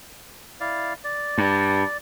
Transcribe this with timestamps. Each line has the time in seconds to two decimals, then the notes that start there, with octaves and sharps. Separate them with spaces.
0.60 E4 D5 F5
1.04 D5
1.38 G2